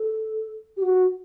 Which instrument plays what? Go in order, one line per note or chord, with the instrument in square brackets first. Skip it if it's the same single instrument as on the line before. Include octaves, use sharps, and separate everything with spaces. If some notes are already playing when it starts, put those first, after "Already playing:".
Already playing: [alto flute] A4
G4
F#4